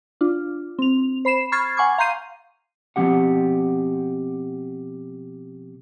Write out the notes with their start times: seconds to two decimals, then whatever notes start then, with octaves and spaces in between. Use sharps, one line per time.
0.21 D4 F4
0.79 C4 F7
1.25 C5 B5 C7 E7
1.52 B5 C#6 F6 G#6 A6 C7
1.77 F#5 G#5 C#6 D6 G#6
1.98 F5 A#5 C6 G6 C7 D#7
2.96 B2 F3 C4 G4 F#5